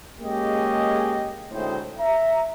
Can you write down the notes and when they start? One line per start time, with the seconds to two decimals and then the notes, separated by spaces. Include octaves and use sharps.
0.20 G#3 A#3 C#4 G4 G#4 D#5
1.51 D2 A2 G#3 C4 D#4 C5
1.99 E5 A#5